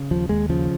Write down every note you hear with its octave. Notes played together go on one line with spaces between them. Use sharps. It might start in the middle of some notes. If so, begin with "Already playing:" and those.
Already playing: C#3
D#2 F3
D#2 G#3
C#3 F3